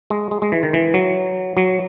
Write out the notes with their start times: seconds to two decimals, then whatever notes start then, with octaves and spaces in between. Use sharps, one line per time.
0.10 G#3
0.31 G#3
0.42 G#3
0.52 E3
0.63 D#3
0.73 E3
0.94 F#3
1.57 F#3